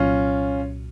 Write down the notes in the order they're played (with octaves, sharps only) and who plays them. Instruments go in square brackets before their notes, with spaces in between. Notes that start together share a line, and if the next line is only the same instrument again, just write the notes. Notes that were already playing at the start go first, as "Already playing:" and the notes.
Already playing: [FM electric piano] C2 A#2 F#3 [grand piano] C#4 F4